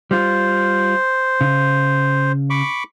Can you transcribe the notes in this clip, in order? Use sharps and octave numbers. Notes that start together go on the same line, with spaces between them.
G3 F4 C5
C#3
B5 C#6 D6